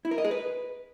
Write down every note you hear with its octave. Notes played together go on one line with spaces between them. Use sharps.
E4
A#4
D#5
G#4
B4